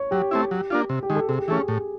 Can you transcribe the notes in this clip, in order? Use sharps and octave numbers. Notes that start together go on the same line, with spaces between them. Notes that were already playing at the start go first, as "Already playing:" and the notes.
Already playing: C#5
F#3 G4
A3 C4 E4
F#3
A#3 D4 F4
C3
G4
D#3 G#3
A4
C3 G#4
G4
E3 A3 C#4 G#4
A2